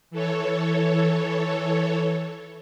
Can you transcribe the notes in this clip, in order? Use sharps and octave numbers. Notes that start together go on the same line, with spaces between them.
E3 A4 C#5